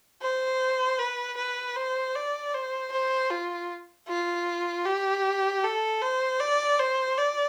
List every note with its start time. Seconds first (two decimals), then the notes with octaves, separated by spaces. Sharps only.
0.22 C5
0.99 B4
1.37 B4
1.76 C5
2.16 D5
2.54 C5
2.92 C5
3.31 F4
4.08 F4
4.86 G4
5.64 A4
6.01 C5
6.40 D5
6.79 C5
7.18 D5